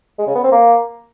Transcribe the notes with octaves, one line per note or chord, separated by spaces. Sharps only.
G#3
C#3
B3
C4
A#3